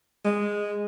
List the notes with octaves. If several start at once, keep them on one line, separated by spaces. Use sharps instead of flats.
G#3